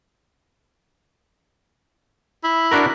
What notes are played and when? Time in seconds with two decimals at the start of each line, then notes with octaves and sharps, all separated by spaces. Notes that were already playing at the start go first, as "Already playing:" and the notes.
2.44 E4
2.71 D4 F#4 A#4